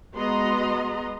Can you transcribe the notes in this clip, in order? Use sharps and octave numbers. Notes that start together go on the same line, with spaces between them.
G#3 B3 F#4 D#5 A#5 C6